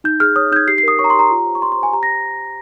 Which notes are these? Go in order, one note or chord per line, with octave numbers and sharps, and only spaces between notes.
D#4 G6
G#4 F6
C#5 D#6
D#4 G6 G#6
G4 C7
C7
A#4 D#6
C#5 C#6
A#5
G4 C6
A#5
F4
C5
C#6
F4 C6
C6
C5
G#5
G4 A#5
A#6